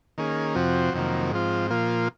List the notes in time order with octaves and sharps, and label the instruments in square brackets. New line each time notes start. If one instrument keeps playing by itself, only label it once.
[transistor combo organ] D#3 A#3 C#4 G#4
F2 C3 F3 C4 F#4
F2 C3 D#3 F#3 A#3
G#2 F3 C4 F4
A#2 F3 A#3 F4